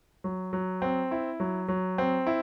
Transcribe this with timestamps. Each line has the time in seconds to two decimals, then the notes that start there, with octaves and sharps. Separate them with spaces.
0.24 F#3
0.53 F#3
0.82 C4
1.11 E4
1.40 F#3
1.68 F#3
1.98 C4
2.27 E4